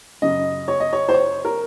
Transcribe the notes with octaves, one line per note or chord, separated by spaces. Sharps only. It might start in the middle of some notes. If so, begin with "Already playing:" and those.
F#2 C#3 D#5
C#5
D#5
C#5
C5
C#5
A#4